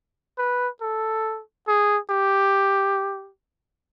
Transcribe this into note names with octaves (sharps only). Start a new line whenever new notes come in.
B4
A4
G#4
G4